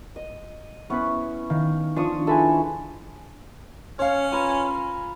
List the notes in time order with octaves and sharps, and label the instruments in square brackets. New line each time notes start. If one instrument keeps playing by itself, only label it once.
[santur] D#5
[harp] B3 B4 [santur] C#4 E4
[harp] D#3 [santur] F5
[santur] F3 C#6 D#6 [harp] D4
[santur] G#3 E4 E6 [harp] A4 B4 G#5
[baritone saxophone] C#4 [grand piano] C#5 F5
[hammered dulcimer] F4 B4 A#5 [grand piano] G#5